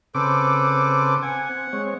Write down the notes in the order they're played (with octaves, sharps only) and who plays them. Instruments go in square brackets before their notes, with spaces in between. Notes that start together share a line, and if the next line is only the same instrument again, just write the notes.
[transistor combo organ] C#3 C4 D6 [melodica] A4 B4 C5
[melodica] F#5 [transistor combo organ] G#5
[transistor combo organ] C4
G#3 C4 C#5